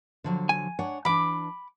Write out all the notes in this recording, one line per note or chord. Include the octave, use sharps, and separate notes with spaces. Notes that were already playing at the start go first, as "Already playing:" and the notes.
D3 F3 F#3
G#5
D4 C#5 F#5
E3 D4 B5 D6